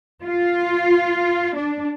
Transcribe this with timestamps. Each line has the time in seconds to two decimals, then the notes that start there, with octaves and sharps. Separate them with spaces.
0.24 F4
1.56 D4